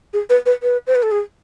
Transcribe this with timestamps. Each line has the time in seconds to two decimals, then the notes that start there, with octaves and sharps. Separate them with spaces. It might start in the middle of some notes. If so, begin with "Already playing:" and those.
0.13 G#4
0.30 B4
0.46 B4
0.63 B4
0.87 C5
0.95 B4
1.03 A4
1.11 G#4